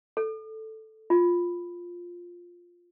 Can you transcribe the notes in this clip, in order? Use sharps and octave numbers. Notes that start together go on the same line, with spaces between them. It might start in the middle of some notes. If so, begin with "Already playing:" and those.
A4
F4